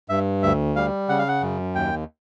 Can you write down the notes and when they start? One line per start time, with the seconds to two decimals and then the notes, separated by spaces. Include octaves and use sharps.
0.09 G2 E5
0.43 D2 E5
0.76 G3 F5
1.09 C#3 F#5
1.19 F5
1.28 F#5
1.42 F#2
1.75 D#2 G5